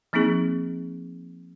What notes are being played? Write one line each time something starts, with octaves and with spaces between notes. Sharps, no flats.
F3 A#3 C4 D#4 G#4